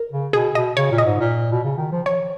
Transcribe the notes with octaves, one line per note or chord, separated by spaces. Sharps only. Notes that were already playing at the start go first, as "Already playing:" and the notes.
Already playing: A#4
C#3
B2 G#4
B2 D#5
C#3 C#5
A#2
D#5
G#2
A#2
B2
C#3
D#3
F3
C#5